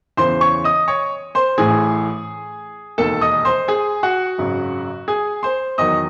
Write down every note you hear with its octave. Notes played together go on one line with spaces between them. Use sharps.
E2 C#3 E3 C5 C6
C#5 C#6
D#5 D#6
C#5 C#6
C5 C6
A1 A2 E3 G#4 G#5
E1 D#2 D#3 A4 A5
D#5 D#6
C5 C6
G#4 G#5
F#4 F#5
G#1 F#2 C#3 F#3
G#4 G#5
C5 C6
E2 D#3 F#3 D#5 D#6